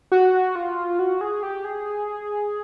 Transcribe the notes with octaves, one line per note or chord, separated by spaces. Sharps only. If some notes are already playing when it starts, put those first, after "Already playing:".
F#4
F4
F#4
G#4
G4
G#4